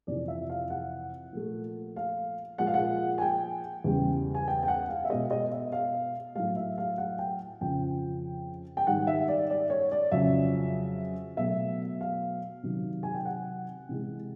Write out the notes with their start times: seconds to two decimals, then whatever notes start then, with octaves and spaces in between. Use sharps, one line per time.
0.07 F2 C3 E3 D5
0.28 E5
0.49 F5
0.70 F#5
1.33 A#2 F3 A3
1.96 F5
2.58 A#2 F3 G#3 F#5
2.67 F5
2.74 F#5
3.18 G#5
3.21 G5
3.84 E2 C#3 E3 G3
4.35 G#5
4.48 G5
4.63 G5
4.68 F#5
4.89 F5
5.05 E5
5.10 B2 G#3 D#5
5.31 D#5
5.52 E5
5.72 F5
6.35 A2 F#3 A3 F5
6.56 E5
6.78 F5
6.98 F#5
7.19 G5
7.61 F2 C#3 F3 G5
8.77 G5
8.87 G#2 D#3 G3 F#5
9.07 E5
9.28 D5
9.50 D5
9.70 C#5
9.92 D5
10.12 F2 C#3 F#3 E5
11.37 B2 F#3 A3 E5
12.01 F5
12.63 C3 D#3 F#3
13.03 G#5
13.15 G5
13.25 F#5
13.89 C3 E3 G#3